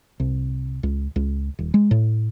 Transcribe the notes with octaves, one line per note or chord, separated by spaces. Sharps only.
C2
C#2
C#2
D#1
G#3
A2